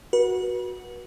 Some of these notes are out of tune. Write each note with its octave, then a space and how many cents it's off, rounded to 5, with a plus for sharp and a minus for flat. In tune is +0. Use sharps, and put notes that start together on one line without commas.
F#4 -5 B4 -35